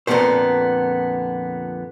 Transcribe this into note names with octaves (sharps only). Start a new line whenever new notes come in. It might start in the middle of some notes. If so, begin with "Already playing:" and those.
F2 A#2 D3 F3 B3 C5